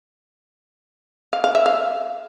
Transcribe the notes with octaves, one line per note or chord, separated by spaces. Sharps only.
F5
F5
E5
F5